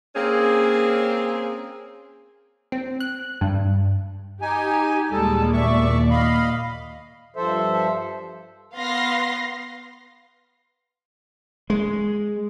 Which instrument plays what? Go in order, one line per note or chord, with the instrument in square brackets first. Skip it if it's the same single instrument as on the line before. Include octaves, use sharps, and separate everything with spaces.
[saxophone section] A#3 C4 C#4 G#4
[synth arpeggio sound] C4
F#6
G2
[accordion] D#4 G#5 [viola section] G4
[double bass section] D#2 A#2 [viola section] G3 G#3 A5 [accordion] A4
[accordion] E2 E5 C#6 [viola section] D5
[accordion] D#5 F5 B5
[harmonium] G2 F3 A4 C5 E5
[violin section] B3 F5 C6 A#6 C7
[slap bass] G#3